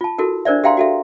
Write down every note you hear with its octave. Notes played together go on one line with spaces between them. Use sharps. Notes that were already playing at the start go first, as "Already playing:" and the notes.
F4 A5
E4 F#4 A4 A#4
D4 A#4 C5 D5 E5
G4 E5 F5 G5 A#5 C6
F#4 A4 E5